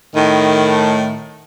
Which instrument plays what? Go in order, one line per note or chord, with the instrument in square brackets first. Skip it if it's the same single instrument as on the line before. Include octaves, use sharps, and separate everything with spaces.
[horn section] A2 D#3